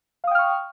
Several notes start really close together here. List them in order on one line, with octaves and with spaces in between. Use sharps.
F5 D#6 G5 F6 C#6